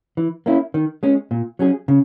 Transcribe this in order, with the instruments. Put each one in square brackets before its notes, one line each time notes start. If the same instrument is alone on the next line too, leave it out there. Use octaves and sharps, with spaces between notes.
[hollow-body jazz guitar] E3
A#3 C#4 E4
D#3
G#3 C#4
A#2
F#3 C#4 G#4
C#3